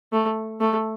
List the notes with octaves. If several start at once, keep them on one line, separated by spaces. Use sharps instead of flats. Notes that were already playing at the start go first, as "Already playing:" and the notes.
A3
A3